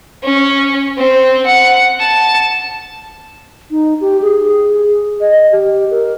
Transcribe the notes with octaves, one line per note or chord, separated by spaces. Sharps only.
C#4
C4
F#5
A5
D#4
G4
G#4
D#5
G4
A#4